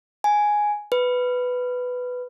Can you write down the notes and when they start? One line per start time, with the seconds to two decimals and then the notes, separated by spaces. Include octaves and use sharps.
0.24 G#5
0.92 B4